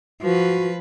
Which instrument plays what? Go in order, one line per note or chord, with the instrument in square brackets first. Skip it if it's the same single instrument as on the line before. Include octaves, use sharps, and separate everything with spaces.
[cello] F3 B4 [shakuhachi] F#4